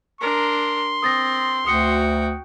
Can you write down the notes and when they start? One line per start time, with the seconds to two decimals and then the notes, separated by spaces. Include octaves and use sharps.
0.21 D4 A#4 C6
1.02 C4 D#6 A6 A#6
1.66 D2 F#4 G5 D#6 C#7